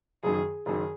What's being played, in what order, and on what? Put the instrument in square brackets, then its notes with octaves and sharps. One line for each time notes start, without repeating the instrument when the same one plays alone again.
[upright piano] F#1 F#2 D#3 [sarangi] G#4
[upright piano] F#1 F#2 D#3 [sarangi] G#4